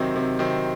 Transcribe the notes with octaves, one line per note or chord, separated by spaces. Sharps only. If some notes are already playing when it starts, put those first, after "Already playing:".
Already playing: C3 D#3 F#3 C4
C3
D#3 F#3 C4